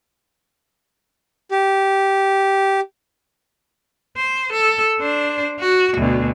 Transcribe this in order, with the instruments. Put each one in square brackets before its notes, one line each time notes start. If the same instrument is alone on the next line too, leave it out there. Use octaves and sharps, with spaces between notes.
[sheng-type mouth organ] G4
[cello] C5
A4
D4 C5
F#4
D2 B2